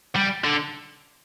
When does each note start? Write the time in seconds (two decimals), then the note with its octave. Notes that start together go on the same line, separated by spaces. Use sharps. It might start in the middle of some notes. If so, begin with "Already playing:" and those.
0.16 G3
0.44 D3